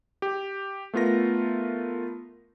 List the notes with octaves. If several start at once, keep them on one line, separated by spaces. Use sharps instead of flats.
G4
A3 B3 F4 A#4 A#6